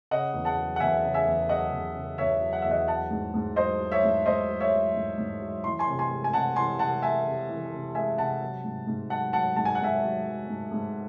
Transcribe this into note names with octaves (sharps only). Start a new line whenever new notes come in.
C#3 D#5 F#5
E2
F#5 A5
F#3
F#5
E2 E5 G#5
C#3
E5 G#5
E2
F#3 D#5 F#5
E2
C#3
E2 C#5 E5
F#3
F#5
E2 E5
D#5 F#5
F#3 F#5 A5
G#2
G#2
F#3 C5 D#5
F#3
C#5 E5
G#2
G#2 C5 D#5
F#3
C#5 E5
F#3
G#2
G#2
F#3
E3 C6
G#5 C6
C3
G#5 C6
G#3
G#5
C3 F#5 A5
E3 G#5 C6
C3 F#5 A5
G#3 E5 G#5
C3
E3
C3
G#3 E5 G#5
C3 F#5 A5
F#3
G#2
G#2
F#3 F#5 A5
F#3 F#5 A5
G#2 A5
G#5
F#5
G#2 E5 G#5
F#3
F#3
G#2
G#2